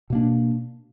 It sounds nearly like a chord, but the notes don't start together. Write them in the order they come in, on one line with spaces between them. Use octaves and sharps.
B2 A#3 D4